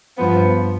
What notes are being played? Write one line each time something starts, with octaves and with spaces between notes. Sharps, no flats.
G2 F3 B3